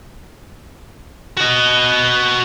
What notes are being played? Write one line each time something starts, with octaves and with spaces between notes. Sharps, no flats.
F#4 D#5